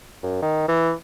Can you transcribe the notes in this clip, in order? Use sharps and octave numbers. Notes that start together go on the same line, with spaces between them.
F#2
D#3
E3